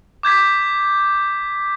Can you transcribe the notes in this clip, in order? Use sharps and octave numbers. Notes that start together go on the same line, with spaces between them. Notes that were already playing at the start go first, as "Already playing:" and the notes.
D6 G6 G#6 B6